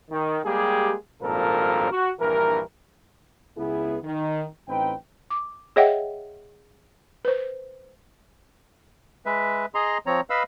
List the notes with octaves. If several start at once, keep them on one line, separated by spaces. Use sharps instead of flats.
D#3
G3 G#3 A#3 G4 G#4
G#1 G2 A#2 F3 A4 A#4
F#4
A#1 G2 E3 A#4
C#2 B3 E4 G#4
D#3
A1 C4 D#4 B4 G5
D6
G#4 C#5 D#5 E5 F#5 G5
B4 C5
G#3 B4 E5
G#4 D#5 A#5 C6
F3 C4 C#5 A#5
B4 D#5 F5 B5 E6